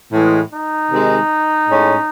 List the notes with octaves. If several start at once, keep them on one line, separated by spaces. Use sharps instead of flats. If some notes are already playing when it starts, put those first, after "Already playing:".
A2 E3 G#3
D#4
C3 D#3 G#3
A2 G#3 C#4